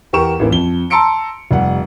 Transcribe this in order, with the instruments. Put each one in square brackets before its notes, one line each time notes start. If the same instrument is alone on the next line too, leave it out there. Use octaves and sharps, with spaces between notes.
[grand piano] E2 G4 A#4 C#6 E7
A1 E3 A#3
F2 G7
A5 A#5 C6 E6 C#7 D7
F1 G3 F#5